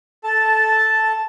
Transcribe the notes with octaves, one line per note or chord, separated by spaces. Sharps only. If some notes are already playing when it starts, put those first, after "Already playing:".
A4 A5